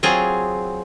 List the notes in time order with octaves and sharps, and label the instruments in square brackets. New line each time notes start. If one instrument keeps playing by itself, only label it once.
[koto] F#3 C4 F4 G#4